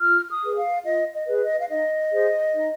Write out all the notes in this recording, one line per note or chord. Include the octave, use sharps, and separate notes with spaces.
F4 F6
D#6
G#4 B4
F5
F4 D#5
D#5
G#4 B4
D#5
F5
D#4 D#5
G#4 C5
D#4